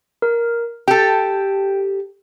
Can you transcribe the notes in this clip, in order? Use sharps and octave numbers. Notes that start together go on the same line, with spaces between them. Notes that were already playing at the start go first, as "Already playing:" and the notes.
A#4
G4 A4 G5